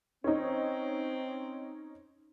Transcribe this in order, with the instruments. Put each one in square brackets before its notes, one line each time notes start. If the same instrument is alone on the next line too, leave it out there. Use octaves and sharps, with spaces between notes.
[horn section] C4 [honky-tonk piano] C#4 D#4